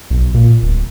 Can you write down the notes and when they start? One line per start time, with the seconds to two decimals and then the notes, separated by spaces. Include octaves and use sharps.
0.10 B1
0.34 A#2
0.62 D1